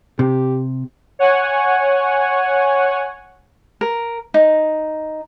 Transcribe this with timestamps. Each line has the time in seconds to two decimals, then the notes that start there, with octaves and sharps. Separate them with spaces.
0.19 C3 G4
1.19 C#5 F#5 G#5
3.81 A#4
4.34 D#4